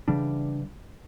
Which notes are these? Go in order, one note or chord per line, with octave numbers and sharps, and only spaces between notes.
C#3 E3 G3 D4